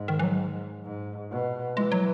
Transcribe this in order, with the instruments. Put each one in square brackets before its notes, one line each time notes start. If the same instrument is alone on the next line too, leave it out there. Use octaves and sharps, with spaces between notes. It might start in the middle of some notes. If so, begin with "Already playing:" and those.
Already playing: [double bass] G#2
[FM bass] D#3
E3
F#3
[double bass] G#2
B2
[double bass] E3 [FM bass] G#3
[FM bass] F#3